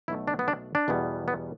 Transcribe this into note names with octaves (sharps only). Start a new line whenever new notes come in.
B1 B2 A3 E4
D4
B3
D4
D4
E2 B2 G3 B3
B3